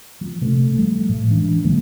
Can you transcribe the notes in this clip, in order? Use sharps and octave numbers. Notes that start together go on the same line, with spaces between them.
F3
C3 A3
F3 G3 A3
A2
E3 G#3 D4
D3 F#3 G#3 A#3